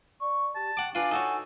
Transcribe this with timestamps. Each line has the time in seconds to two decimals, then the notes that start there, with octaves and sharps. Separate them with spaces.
0.21 D5 C#6
0.55 G4 A5
0.77 F#5 G5 D6
0.95 D4 F4 B4 G#5
1.11 D#4 F#4 A4 C#5